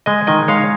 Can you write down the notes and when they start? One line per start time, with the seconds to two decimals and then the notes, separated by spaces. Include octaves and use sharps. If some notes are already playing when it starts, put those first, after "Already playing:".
0.06 G#3 D#5 G#5
0.27 D#3 D#5 G#5
0.48 G#3 C#5 F5